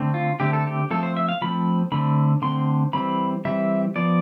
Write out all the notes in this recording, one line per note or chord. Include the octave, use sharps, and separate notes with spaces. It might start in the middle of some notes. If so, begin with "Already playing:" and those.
Already playing: D3 A3 C4
F4
D3 A3 C4 G4
A4
G4
F3 A3 C4 A4
C5
E5
F5
F3 A3 C4 B5
D3 A3 C4 B5
D3 A3 C4 C6
E3 G3 C4 B5
E3 G3 C4 E5
F3 B3 D5